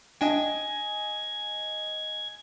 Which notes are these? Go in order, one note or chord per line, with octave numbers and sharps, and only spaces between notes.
D4 D#5 G5 G#5 G#6